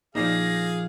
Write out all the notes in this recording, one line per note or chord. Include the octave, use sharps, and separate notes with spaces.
A#2 F3 D#4 G#4 D5 F5 A#6 C7